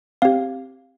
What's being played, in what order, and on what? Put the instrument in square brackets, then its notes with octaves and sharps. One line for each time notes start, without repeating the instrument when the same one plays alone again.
[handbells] C4 G4 F5